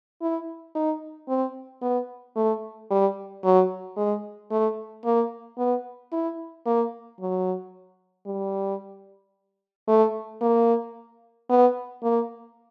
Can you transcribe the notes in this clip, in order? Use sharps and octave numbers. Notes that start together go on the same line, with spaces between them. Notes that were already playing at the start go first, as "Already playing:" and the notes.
E4
D#4
C4
B3
A3
G3
F#3
G#3
A3
A#3
B3
E4
A#3
F#3
G3
A3
A#3
B3
A#3